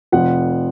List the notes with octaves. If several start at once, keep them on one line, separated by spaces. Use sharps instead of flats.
F1 F2 F3 F#5